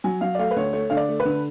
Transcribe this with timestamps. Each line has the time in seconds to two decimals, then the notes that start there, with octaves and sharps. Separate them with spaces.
0.04 F#3 G#5
0.21 F#3 F5
0.35 D5
0.39 A3 F5
0.51 B4
0.56 D2 C#5
0.73 A3 C#5
0.90 D3 F5
0.97 D5
1.09 A3
1.20 B4
1.25 D3